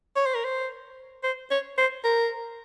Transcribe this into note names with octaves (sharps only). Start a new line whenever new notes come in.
C#5
C5
A#4
C5
C5
C#5
C5
A#4